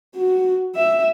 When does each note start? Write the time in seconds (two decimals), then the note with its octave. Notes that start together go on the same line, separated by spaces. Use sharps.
0.16 F#4
0.75 E5